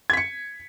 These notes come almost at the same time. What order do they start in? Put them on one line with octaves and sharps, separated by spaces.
G#6 B6 C#7